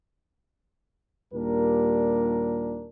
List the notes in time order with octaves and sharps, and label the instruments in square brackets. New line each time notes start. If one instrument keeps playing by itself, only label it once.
[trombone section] D#2 A#2 G3 D4 A#4